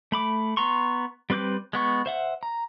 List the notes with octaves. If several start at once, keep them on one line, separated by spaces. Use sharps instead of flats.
A3 B5 D6
B3 A#5 C6 C#6
G3 C4 B4 D6 G6
G#3 B3 C#6
C5 E5 F#5
A#5